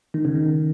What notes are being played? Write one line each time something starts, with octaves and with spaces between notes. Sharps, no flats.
D#3
C#3
D#3